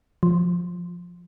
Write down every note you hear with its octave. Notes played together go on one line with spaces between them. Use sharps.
F3